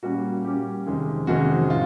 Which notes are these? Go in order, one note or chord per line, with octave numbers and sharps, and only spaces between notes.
A#2 G3 A#3 C#4 F#4
A#2 G3 A#3 C#4 G4
F2 C3 D#3 G#3 C#4
F2 C3 D#3 G#3 C#4 F#4
A2 F4